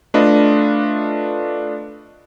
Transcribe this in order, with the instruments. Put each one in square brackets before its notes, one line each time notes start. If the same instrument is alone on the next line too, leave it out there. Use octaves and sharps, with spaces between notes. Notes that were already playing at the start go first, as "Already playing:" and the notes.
[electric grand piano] A3 D4 F4 B4 D#5